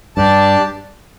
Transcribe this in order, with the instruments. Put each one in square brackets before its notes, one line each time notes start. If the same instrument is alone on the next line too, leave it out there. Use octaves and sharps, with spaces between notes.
[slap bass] G2 [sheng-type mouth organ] D4 G4 D5 A5